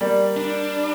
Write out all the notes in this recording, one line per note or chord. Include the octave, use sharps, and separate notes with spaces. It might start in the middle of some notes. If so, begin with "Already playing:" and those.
G3 A#3
D4